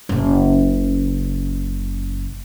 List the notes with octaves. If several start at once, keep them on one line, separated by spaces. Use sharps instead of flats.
F#1 C#3